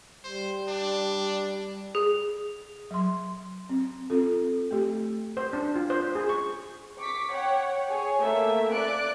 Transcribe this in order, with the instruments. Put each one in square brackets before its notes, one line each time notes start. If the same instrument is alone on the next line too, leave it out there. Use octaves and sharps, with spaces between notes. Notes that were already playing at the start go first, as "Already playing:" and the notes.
[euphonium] G3 [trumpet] C5
[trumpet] D4
[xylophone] G#4
[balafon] F#3 C6
C4
C4 F4 A4
A3 G4
[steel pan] C5
D4
F4
C5
G#4
C#6
[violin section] C#6 D6 B6
C#5 F#5 G5
G#4 C#5
A3 A#3 E5
D5 F#6 D7